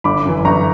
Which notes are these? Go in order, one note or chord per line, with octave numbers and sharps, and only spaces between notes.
G1 B5 D6
F#2 E3
G1 A#5 C#6